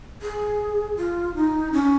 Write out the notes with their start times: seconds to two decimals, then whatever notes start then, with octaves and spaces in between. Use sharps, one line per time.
0.22 G#4
0.97 F4
1.35 D#4
1.73 C#4